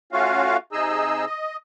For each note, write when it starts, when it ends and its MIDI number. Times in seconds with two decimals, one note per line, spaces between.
0.12 0.57 57
0.12 0.57 61
0.12 0.57 65
0.12 0.57 66
0.12 0.57 77
0.72 1.25 48
0.72 1.25 63
0.72 1.25 68
0.72 1.25 75
0.72 1.25 88
1.26 1.56 75